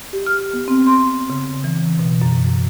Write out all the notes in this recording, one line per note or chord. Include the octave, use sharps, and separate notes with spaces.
G4
F6
B3
C4
C6
C#3
E3
B2
F#2